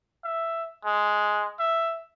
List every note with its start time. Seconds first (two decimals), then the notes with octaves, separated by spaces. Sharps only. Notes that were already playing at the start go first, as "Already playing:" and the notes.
0.24 E5
0.85 G#3
1.60 E5